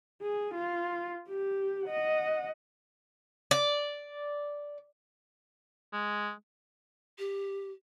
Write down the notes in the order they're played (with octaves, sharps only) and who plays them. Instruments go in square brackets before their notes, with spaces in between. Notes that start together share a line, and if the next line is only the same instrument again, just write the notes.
[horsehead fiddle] G#4
F4
G4
D#5 F#5
[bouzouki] D5
[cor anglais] G#3
[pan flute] G4